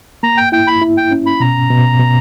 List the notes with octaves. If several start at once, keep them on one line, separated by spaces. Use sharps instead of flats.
A#3 A#5
G5
E4 G5
B5
E4
G5
C#4
B5
B2 A#5
B2
B2